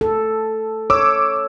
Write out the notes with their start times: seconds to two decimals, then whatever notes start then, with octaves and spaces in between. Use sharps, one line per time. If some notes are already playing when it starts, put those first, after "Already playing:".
0.01 A4
0.90 C#5 D6 E6